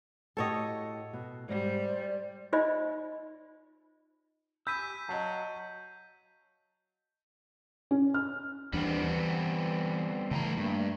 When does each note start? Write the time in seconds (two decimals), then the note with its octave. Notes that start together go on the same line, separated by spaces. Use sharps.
0.37 A2 F#4 G4 A4 C#5 D#5
1.13 B2
1.49 G#2 G3 C5 D5
2.53 D#4 F4 C5 D5 D#5 B5
4.67 G4 G#5 B5 E6 G6 B6 D#7
5.09 F#3 D#5 F5 A5
7.91 C#4
8.14 F6
8.73 D#2 E3 G3 B3 C4 D4
9.04 E3
10.31 A2 C#3 E3 A3 A#5
10.58 G2 A3 A#3